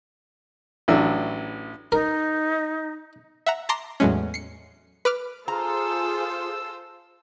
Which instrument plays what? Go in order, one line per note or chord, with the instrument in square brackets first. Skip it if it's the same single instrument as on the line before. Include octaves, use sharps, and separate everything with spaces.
[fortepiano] A1 E3 F#3 D4 E6
[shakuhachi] D#4 [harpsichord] A#4
[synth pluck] E5 F#5 A#5
A5 A#5 C6 D6 A#6
E2 A2 F#3 G#3 C#4
C7 C#7
B4 D6 F6
[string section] F4 A4 C5 [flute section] G#4 [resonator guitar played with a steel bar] A#5 [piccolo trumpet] E6